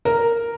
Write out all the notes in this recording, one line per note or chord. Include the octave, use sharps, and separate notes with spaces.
A#4